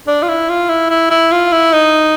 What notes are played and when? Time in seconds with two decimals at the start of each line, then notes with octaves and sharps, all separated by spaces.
0.07 D4
0.23 F4
0.28 E4
0.49 F4
0.69 E4
0.90 E4
1.10 E4
1.32 F4
1.52 E4
1.73 D#4